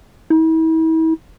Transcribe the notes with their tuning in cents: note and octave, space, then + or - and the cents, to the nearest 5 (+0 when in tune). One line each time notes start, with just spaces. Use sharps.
E4 -40